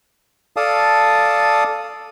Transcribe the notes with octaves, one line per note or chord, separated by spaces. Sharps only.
A4 D5 F5 A5 D#6